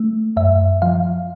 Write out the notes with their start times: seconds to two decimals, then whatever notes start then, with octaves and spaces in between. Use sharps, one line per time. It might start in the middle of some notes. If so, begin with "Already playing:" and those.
Already playing: A3
0.37 F#2 E5
0.82 F3 F5